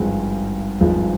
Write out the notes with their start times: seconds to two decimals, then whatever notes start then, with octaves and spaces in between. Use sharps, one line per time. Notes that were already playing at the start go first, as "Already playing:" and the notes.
Already playing: G#1 G2 F3 G#3
0.81 G#1 G2 F3 G#3